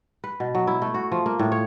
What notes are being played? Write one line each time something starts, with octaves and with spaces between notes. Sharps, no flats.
B4
B2
F#3
E4
A3
F#4
F3
A#3
A2
C#5